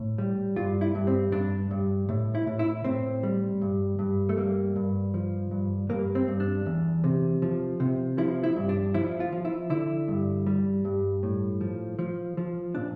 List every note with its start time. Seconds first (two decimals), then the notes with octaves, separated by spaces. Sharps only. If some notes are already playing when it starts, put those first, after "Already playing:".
Already playing: A2
0.18 G3
0.56 G2 F4
0.81 E4
0.95 G2
1.07 C4
1.32 G2 D4
1.71 G2
2.09 A2
2.35 E4
2.47 A2
2.59 E4
2.84 A2 C4
3.23 G3
3.62 G2
3.99 G2
4.29 A3
4.37 G3 A#3
4.76 G2
5.14 F3
5.51 G2
5.89 G2 A#3
6.15 C4
6.28 G2
6.40 D4
6.66 E2
7.04 C3
7.42 F3
7.80 C3
8.18 F3 E4
8.43 E4
8.56 G2
8.69 D4
8.94 F3 E4
9.20 F4
9.32 F3
9.45 E4
9.70 D3 E4
10.08 G2
10.46 G3
10.85 G2
11.23 A2
11.61 F3
11.99 F3
12.37 F3
12.75 A#2 D4